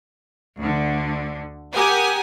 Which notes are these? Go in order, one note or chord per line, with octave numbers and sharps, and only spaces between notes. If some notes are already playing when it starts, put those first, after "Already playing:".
D2 D3
G4 A#4 F#5 G#5 D#6